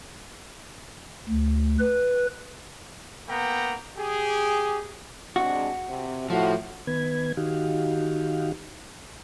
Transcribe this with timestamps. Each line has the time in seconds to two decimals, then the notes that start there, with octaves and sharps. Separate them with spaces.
1.29 D2
1.79 B4
3.29 A#3 B3 F#5 G5 A#5
3.98 G4 G#4
5.36 C3 G#3 D4 F#4
5.89 C3
6.30 A2 F3 F#4
6.87 D#3 B3 B4 G#6
7.37 D#3 D#4 F#4 G4 F5